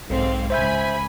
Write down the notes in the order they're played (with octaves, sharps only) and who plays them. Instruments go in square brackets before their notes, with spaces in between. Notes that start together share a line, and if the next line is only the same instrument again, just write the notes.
[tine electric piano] B1 [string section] G#2 C4 F5
[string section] C#2 G#5 B5 [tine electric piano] C5 E5 G6